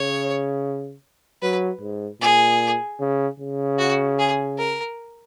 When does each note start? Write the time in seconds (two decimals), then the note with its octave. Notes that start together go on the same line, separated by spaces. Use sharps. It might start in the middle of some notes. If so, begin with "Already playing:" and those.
Already playing: C#3 C#5
1.42 F#3 B4
1.81 G#2
2.21 A#2 G#4
3.00 C#3
3.40 C#3
3.79 F#4
4.19 G#4
4.58 A#4